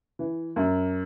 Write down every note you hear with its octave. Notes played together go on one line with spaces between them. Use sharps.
E3
F#2